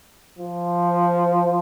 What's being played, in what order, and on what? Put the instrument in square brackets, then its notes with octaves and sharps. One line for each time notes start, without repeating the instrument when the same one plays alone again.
[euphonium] F3